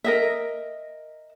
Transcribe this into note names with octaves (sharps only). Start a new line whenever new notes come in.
A#4 D#5 E5